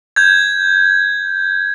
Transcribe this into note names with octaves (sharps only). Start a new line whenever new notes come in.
G6 G#6